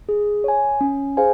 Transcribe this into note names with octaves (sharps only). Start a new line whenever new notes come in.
G#4
C#5 G#5
C#4
G#4 C5 F5 G#5